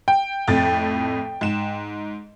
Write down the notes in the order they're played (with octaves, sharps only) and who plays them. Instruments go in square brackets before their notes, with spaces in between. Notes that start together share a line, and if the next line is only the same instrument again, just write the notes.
[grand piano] G5
[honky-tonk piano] F2 A2 A6
G#2 E7